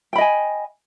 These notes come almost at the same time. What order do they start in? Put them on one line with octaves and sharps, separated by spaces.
G5 B5 D#5 G#5